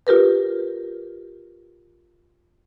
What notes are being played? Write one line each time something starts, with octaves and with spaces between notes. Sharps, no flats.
F4 G4 A#4 B4